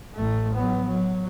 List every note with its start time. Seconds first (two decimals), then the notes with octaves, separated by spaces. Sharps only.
0.15 A1 A3
0.55 F#3 B3
0.86 F#3